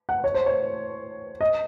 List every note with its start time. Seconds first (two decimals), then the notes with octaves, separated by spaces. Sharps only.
0.09 F#5
0.24 C#5
0.34 C5
0.46 C#5
1.41 D#5